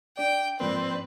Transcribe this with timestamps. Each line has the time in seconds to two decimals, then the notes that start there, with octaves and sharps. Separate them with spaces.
0.17 D4 D5 G5
0.60 G#2 F3 A#3 C4 B4 D5